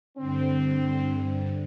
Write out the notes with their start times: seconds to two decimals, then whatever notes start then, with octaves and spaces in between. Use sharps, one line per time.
0.17 G2 D3 C4